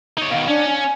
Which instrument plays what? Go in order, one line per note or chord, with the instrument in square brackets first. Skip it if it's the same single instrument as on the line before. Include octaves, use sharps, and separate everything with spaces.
[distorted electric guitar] D#4 C#5
[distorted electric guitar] B2 D#3 [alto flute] F5
[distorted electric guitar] C#4 [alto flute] D4
[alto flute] G#5